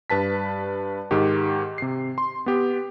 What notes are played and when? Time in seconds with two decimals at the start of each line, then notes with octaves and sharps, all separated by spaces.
0.10 G2 B4 A5 B6
1.11 G#2 D#3 G4
1.78 C3 C7
2.18 C6
2.46 B3 G4